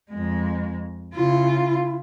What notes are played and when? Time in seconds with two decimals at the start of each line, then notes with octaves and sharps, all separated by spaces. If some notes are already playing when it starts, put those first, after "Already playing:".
0.10 F2 G#3
1.14 C#3 E4 F4